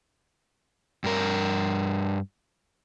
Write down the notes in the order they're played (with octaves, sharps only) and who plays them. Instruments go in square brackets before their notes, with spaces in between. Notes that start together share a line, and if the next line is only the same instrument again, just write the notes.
[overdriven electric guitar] G2 A#4